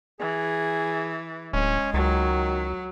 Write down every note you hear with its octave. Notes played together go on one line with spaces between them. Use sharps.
E3 G#4
D1 G#3 C#4
C#2 D#3 F#3